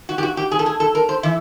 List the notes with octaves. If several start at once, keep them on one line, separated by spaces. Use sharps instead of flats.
F#4
G4
F#4
G4
G#4
A4
G#4
A4
A#4
C5
E3 E5